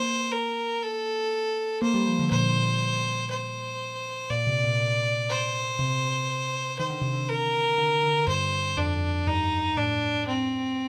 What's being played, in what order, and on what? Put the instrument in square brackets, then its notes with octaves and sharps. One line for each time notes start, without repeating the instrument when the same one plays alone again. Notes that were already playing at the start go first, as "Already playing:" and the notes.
Already playing: [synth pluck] A#3 [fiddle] C5
[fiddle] A#4
A4
[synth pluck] A#3 [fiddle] C5
[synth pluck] G3
F3
D3
[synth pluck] A#2 [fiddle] C5
[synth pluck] A#2
[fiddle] C5
[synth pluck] A#2 [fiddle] D5
[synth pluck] C3
A#2
A#2
[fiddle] C5
[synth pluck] C3
[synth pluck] D#3 [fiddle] C5
[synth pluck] D3
C3
D3
[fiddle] A#4
[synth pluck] D3
D3
[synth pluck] G2 [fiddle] C5
[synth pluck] F2 [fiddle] D4
[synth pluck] F2
[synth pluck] G2 [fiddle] D#4
[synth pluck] A2 [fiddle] D4
[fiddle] C4